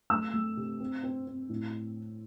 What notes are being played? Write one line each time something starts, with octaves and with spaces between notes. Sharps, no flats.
A3 E6
A3
C3
C4
C4
C4
A2